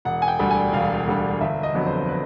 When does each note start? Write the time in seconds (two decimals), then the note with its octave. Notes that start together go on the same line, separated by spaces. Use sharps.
0.05 E1 F#5
0.22 G#5
0.28 G5
0.39 D2 D3 G3
0.50 G#5
0.73 E1 F5
1.07 D2 D3 G3
1.41 G1 E5
1.63 D#5
1.75 F2 D3 F#3 B3
1.86 C5
2.09 B4